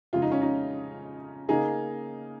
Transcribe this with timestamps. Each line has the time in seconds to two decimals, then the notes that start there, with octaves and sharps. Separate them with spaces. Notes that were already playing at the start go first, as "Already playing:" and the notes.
0.13 F2 C#3 G#3 F4
0.22 D#4
0.32 C#4
0.42 D#4
1.49 C#3 A#3 D#4 G#4